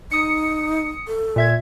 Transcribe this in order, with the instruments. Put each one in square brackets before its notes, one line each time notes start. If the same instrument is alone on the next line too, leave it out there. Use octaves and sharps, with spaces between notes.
[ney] D#4 [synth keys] D#6 C#7
[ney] A4
[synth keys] A#2 E5 G#6